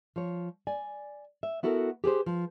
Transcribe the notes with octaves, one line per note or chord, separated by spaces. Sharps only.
F3 C#5
D5 G#5
E5
B3 E4 F#4 A4 A#4
G4 G#4 B4 C5
F3